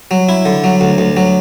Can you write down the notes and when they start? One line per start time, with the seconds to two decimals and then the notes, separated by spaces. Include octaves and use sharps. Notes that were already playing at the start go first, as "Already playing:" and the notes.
0.11 F#3
0.29 E4
0.45 D3
0.64 F#3
0.81 D2
0.98 D2
1.17 F#3